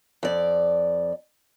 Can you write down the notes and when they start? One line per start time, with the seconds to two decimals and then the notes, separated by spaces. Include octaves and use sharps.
0.23 F2 D5